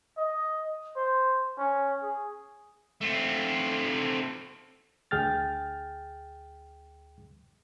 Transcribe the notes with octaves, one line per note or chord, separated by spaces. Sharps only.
D#5
C5
C#4
G#4
A3 C4
D2 G#4 G5 F6 A6